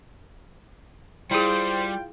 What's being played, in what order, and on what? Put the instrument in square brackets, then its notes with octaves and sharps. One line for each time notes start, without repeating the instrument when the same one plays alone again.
[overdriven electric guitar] G3 [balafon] E4 G#4 [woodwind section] F4 G5 [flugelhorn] C5